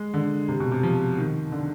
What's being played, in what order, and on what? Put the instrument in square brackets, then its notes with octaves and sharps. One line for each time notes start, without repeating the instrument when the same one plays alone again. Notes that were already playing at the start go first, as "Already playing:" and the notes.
Already playing: [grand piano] G#3
D3
C3
B2
C3
F3
D#3
D3